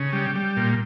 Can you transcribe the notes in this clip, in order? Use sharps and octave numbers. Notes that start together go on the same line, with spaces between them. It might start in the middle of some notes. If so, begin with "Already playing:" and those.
Already playing: C#3
G3
G3
A#2